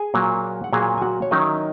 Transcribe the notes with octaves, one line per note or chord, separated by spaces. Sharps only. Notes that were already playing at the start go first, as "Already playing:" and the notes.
Already playing: G#4 G#5
A#2 F#3 A#3
F#5
A#2 F#3 A#3 G#4 G#5
G#5
F#4 F#5
C#5
D#3 F#3 C#4 D#4 E4 D#5